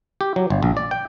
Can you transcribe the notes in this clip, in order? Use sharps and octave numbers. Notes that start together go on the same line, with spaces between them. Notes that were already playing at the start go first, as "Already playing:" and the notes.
G4
F#3
G1
A#1
D5
G5